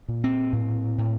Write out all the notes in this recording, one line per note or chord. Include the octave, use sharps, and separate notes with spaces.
A#2
C4
A2
A2